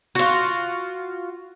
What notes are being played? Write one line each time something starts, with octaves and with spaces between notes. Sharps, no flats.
F4 F#4